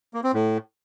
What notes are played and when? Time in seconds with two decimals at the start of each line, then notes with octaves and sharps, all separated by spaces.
0.14 A#3
0.24 C4
0.34 A2